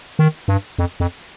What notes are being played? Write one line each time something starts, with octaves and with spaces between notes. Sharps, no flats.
D#3
G2
F2
F2